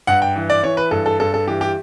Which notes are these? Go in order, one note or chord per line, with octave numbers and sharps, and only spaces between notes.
G2 F#5
G5
E3
D5
E3 C#5
B4
G2 A4
A4
G2 A4
A4
E3 G4
G4